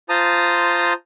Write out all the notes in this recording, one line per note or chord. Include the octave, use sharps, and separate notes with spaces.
F4 C5 A5 A#5 D#6